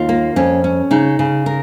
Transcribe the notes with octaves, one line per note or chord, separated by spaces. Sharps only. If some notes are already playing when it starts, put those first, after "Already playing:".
Already playing: D#2 F4
A#3
F2 C#4
C#4
C#3 D#4
C#3
A#4